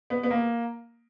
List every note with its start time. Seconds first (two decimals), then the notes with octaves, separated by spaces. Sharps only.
0.10 B3
0.23 B3
0.31 A#3